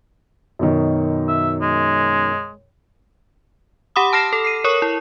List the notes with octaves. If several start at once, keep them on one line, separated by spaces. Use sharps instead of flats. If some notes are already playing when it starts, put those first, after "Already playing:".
F#2 B2 D#3
E5
G#3
G4 F#5 B5 D6 D#6
A5 F6 A#6 C7 E7
A4
C7 D#7
A#4 C#5 C#6 D#6
E4